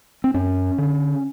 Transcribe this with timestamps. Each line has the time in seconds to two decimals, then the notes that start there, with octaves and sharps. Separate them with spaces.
0.24 C4
0.34 F#2 C#4
0.78 D3